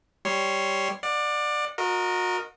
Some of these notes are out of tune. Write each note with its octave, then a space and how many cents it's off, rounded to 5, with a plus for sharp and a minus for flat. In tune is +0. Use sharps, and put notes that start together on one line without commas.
G3 +0 C#5 +0 C6 +0
D5 +20 F#5 -25
F#4 -35 A#4 +0 D#5 +0